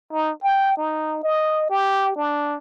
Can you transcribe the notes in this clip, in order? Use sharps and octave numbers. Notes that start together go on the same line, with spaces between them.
D#4
G5
D#4
D#5
G4
D4